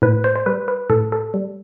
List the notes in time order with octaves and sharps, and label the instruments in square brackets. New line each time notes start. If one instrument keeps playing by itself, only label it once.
[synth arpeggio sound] A2 B4
C5
C5
G3 B4
B4
A2 A4
A4
G3